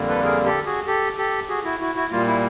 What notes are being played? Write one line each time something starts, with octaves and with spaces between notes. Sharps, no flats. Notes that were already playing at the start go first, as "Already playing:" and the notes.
Already playing: F2 D3 G3 A#3
A4 B4
G#4 A#4
G4 A4
F#4 G#4
G4 A4
G4 A4
F#4 G#4
E4 F#4
E4 F#4
E4 F#4
A#2 G3 A#3 F4
E4